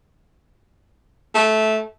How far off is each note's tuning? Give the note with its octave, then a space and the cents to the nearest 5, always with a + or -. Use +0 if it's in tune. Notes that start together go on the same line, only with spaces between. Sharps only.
A3 -15